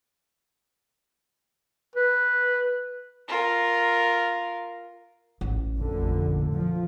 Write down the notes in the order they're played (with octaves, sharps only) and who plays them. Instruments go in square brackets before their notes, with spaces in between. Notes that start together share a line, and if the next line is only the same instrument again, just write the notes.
[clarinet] B4
[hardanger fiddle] F4 A#4
[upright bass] A1
[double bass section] F1 A#1 D3
F3